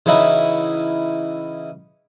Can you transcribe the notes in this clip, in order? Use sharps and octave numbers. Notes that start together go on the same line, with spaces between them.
C#3 E3 C#4 D#4 E4 F#4